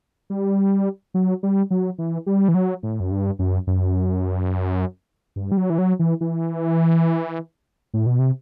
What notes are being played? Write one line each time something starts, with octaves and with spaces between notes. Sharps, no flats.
G3
F#3
G3
F#3
E3
G3
E3
F#3
A2
F#2
G2
F#2
F#2
G2
G3
F#3
E3
F#3
E3
E3
A2
B2
C3